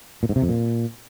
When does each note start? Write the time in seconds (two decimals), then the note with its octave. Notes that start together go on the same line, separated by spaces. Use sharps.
0.23 A#2
0.29 G#2
0.36 C3
0.42 F2
0.49 A#2